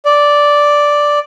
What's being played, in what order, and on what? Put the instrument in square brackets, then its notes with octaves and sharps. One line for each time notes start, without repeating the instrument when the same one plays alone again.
[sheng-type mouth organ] D5